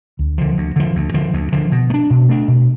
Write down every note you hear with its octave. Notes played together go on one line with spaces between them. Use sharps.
D2
D3 F3
D2
D3 F3
D2
D3 F3
D2
D3 F3
B2
A3
D4
B2
A3 D4
B2